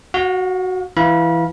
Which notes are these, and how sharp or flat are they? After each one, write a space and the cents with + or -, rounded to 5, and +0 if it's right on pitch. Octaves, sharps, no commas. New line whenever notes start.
F#4 +0 F5 +45
E3 +10 F5 +5 B5 -35